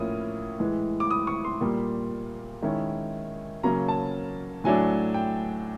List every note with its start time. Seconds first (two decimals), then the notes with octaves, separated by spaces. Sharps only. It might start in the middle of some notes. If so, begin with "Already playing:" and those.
Already playing: A2 F3 A#3 C#4 E4 D#6
0.60 A2 E3 G#3
1.00 D6
1.11 D#6
1.27 C#6
1.45 C6
1.61 A#2 G3 A#3
2.62 D#3 G#3 C#4 E4
3.63 C#3 F#3 A#3 C#4 A#5
3.88 A5
4.64 A2 F#3 A3 D4 G#5
5.14 G5